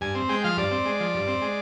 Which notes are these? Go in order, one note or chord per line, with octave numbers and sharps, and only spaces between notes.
G2 G#5
C4
G#3 G5
F3 F5
G2 D5
C4
G#3
F3
G2
C4
G#3